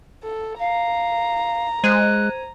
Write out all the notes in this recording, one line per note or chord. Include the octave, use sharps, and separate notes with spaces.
A4
F5 A#5
G#3 C5 F#6 G#6 D#7